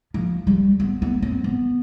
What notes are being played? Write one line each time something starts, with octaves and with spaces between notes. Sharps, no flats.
F3
G3
B3
B3
C4
B3